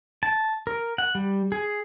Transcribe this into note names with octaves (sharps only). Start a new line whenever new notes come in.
A5
A#4
F#5
G3
G#4